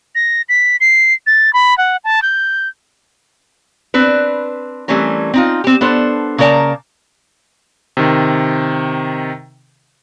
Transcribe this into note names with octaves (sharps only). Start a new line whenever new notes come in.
A#6
B6
C7
A6
B5
F#5
A5
G6
C4 D4 B4
E3 G3 A3 C4 C#4 A#4
C4 D#4 F4
C4 G4
B3 D4 A4 C5
C#3 A#3 A#4 D5 A5 A#5
C3 D#3